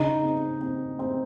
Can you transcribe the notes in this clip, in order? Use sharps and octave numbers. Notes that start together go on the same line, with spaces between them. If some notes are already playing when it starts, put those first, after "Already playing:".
Already playing: C#3 D#4
C4
C4
C4